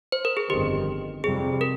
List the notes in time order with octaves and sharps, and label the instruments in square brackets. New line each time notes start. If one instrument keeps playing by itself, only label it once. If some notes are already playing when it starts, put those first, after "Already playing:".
[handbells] C5
A#4
G#4
[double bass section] G1 F2 D#3 [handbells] G4
[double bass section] F2 C3 G3 C4 [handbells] G#4
[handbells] A#4